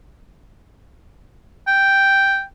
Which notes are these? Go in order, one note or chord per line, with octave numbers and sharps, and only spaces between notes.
G5